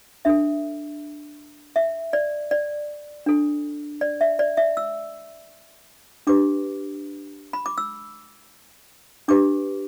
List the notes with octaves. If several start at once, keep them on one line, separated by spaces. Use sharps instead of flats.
D4 A4 E5
E5
D5
D5
D4 A4
D5
E5
D5
E5
E6
D4 G4 B4 D6
B5
D6
E6
D4 G4 B4 D6